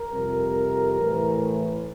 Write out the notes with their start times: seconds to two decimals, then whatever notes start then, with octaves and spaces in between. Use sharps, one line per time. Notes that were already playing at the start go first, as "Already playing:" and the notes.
Already playing: A#4
0.11 F2 C3 G3
0.97 A2 E3 A3